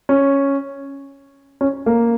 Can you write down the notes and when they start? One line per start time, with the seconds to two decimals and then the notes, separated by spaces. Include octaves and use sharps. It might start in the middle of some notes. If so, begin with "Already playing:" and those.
0.09 C#4
1.61 C#4
1.86 A#3